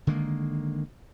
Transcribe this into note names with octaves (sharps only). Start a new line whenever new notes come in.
D3 D#3 G#3 A#3